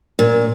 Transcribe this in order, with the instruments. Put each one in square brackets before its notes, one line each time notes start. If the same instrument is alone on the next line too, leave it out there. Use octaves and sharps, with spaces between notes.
[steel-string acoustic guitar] A#2